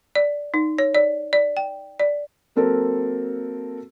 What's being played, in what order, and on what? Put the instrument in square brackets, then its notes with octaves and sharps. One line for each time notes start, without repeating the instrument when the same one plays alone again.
[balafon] D5
D#4
C#5
D5
D5
G5
D5
[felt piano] F#3 A#3 C4 A4 A#4